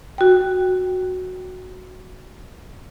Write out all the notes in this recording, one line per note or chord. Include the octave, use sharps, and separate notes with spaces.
F#4 G5